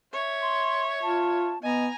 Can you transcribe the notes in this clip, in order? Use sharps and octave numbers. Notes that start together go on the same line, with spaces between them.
C#5 E5
C6
F4 A5
B3 D#5 G#5 A#5